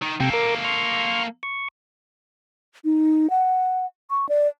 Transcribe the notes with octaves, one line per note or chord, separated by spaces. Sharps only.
D#3
C3 A#3 A4 G5
A#4 D6
C6 C#6 F6
C#6
D#4
F#5
C#6
D5